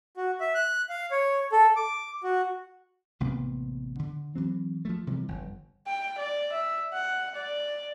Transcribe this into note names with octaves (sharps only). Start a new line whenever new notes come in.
F#4
E5
F#6
F5
C#5
A4
D6
F#4
A1 C3 A#3 B3
D3
E3 F#3 C4
F3 G3 A3
C3 E3 F3 G3
G1 F2
G5
D5
E5
F#5
D5